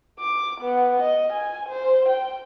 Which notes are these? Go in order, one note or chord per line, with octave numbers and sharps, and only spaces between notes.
D6
B3
D#5
G#5
C5
G5